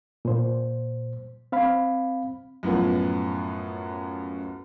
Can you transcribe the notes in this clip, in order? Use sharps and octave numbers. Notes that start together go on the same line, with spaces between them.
A#2 C5
C4 F5 B5
F#2 A2 F3 B3